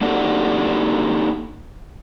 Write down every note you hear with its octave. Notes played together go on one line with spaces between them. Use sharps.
A#3 D4 D#4 F#4 G4 A4